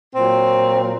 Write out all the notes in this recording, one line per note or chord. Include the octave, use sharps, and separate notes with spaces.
A#2 F#3 C4